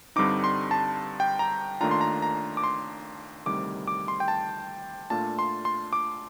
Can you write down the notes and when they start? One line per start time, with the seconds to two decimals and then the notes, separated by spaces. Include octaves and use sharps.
0.16 G2 D3 G3 C4 D#4 D6
0.44 C6
0.71 A5
1.20 G5
1.39 A#5
1.81 D#2 D#3 A3 D4 F4 A#5
1.91 C6
2.01 A#5
2.22 A#5
2.57 D6
2.64 C6
3.46 D2 C3 D#3 G3 D6
3.87 D6
4.08 C6
4.20 G5
4.28 A5
5.10 A#2 A3 D4 F4 A5
5.39 C6
5.65 C6
5.93 D6